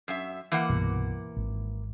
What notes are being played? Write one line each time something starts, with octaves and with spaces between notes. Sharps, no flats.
F#2 E5
E3 A#3 F#5
C2 G2 B2
G#1